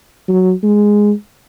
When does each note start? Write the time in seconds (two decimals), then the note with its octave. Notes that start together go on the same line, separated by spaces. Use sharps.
0.28 F#3
0.63 G#3